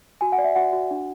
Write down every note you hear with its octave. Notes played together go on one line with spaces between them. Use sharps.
F#4 G#5
F#5
D5
E5
F#4 F#5
F#4
D4